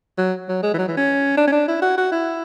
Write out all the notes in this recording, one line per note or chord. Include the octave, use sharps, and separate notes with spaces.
F#3
F#3
G#3
E3
F#3
E3
C#4
D4
C#4
D4
E4
F#4
F#4
E4